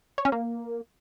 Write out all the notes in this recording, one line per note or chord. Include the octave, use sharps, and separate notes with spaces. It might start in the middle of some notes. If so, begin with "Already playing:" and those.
C#5
C#4
A#3